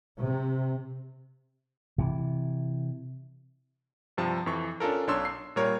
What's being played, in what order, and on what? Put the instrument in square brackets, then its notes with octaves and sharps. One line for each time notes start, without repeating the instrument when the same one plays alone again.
[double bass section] C3
[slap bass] C3 E3
[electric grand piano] G2 C3 F3 A5
F2 E3 C#6
C#4 D4 F4 A4 A#4
B1 D4 C#5 C6 E6
C7
A#2 G3 A#4 C#5